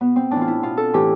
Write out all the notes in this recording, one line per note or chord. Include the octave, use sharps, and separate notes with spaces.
B2 B3
C4
A2 E3 D4
F4
E4
B2 F4
A4
A2 E3 G4